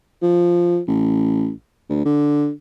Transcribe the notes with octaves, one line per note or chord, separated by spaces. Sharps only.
F3
A1
D2
D3